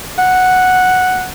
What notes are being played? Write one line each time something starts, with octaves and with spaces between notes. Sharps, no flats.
F#5